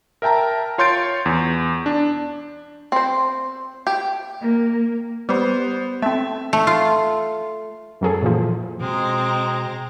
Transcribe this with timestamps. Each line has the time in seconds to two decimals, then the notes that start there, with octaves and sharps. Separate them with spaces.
0.22 A#4 E5 G5 A5 A#5
0.78 F4 C#5 C6 G6 A6 D7
1.26 E2
1.86 D4
2.92 C4 C5
3.87 G4
4.39 A#3
5.29 G3 B3 C5
6.02 A3 C4 E5
6.53 A3
6.67 F4
8.01 F#2 F#3 G#4 A4
8.22 A#2 E3 F3
8.81 B2 G#3 C4 A#5